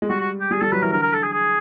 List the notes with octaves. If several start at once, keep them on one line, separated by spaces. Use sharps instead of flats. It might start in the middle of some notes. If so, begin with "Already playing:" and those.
G#3
G3 F#4
F#4
G4
G3 G#4
G3 A4
F#3 B4
E3 A#4
D3 A#4
A#4
A4
G#4
G#4